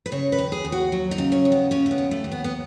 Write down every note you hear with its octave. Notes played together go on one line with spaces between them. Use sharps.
B4
C#3 C#5
B4
D#2
G#4
D#2
F#4
F#3
D#4
C#3
C#4
D#2
B3
C#3 C#4
A3
B3
D#2
A3
D#2
B3
B3